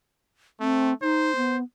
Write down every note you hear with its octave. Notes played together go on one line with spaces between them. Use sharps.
A3 C4
D#4 C5
B3